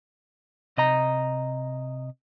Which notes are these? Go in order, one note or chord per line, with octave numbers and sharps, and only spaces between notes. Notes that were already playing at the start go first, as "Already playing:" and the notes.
C3 D#5 A#5